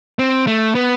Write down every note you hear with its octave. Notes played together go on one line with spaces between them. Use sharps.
C4
A3
B3